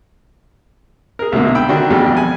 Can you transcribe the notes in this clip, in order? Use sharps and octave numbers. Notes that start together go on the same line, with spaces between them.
G#4 A#4
C2 G#2 B2 D3 A#3
G5 B5 E6
D3 D#3 D4 F#4 G4
A1 F2 B2 G3 G#3 G4
G#5